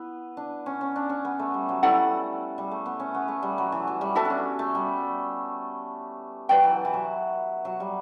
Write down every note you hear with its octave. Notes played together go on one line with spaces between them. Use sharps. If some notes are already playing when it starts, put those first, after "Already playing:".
Already playing: B3 E4
D4
C#4
C#4
D4
C#4
B3
A3
G3
F#3
G3 E4 A4 D5 F#5
G3
A3
B3
C#4
B3
A3
G3
F#3
E3
F#3
G3
B3 F#4 A4 E5 A5
D4
C#4
A3
G3
F#3 B4 D5 G5
E3
E3
F#3
F#3
G3